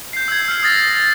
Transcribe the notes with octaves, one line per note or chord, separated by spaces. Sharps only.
G6 C7
E6 G#6
F6 C7
D#6 F6 A6 A#6